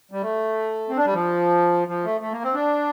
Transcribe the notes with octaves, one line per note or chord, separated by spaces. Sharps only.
G3
A3
C4
D4
G3
F3
F3
A3
A3
A#3
C4
D4